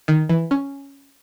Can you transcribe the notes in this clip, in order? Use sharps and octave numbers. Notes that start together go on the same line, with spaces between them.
D#3
E3
C#4